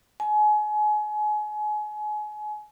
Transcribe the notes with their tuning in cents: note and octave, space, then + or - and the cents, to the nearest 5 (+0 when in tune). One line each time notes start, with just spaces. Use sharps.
G#5 +30